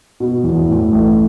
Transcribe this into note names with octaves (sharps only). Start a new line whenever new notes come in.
B2
E2
A2
A1